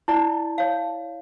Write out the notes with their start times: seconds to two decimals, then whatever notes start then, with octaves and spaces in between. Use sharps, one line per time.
0.08 E4 D5 A5
0.58 C#5 F5